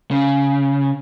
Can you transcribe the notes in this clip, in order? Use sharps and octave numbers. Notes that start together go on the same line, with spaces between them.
C#3